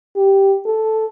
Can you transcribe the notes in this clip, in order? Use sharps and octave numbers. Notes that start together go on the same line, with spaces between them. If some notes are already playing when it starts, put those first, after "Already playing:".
G4
A4